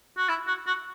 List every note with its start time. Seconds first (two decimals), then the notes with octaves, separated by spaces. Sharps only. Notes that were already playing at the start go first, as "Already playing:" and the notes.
0.17 F#4
0.29 E4
0.47 F#4
0.67 F#4